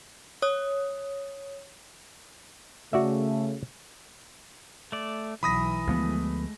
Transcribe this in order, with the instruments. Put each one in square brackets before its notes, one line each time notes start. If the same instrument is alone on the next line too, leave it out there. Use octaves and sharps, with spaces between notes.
[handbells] C#5 D#6
[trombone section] C#3 A3 [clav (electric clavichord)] F#4 D5 E5
[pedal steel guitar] A3 D5
[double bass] B1 F#3 [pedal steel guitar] E3 [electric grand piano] B5 D#6 A#6
[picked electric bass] D2 F3 B3 [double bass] G#3 A3